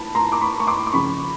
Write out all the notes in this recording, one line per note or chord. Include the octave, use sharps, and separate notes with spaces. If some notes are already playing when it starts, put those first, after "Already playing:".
Already playing: A5 B5
A#5 C6
D6
B5 C#6
C#6
C6 D6
D6
C#3 F3 B5 C#6